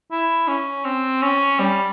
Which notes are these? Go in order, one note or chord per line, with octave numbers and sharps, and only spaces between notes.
E4
C#4
C4
C#4
G3